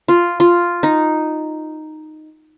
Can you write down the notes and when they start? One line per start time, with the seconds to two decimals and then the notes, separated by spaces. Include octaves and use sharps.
0.08 F4
0.40 F4
0.83 D#4